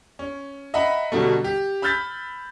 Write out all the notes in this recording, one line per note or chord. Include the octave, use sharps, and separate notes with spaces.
C#4
D#5 E5 F#5 A#5 B5
B2 D3 F#3 G3 A3
G4
B5 E6 F6 G6 A6 B6